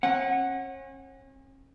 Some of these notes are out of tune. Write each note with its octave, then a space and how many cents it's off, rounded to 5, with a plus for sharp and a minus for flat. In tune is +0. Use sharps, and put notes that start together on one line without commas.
C#4 -35 F#5 +0